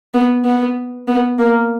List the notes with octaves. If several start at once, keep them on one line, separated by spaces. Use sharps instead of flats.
B3
B3
B3
A#3